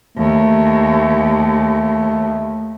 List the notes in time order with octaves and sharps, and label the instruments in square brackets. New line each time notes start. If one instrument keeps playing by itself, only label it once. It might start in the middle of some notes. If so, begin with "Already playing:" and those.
[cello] D#2 [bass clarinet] A3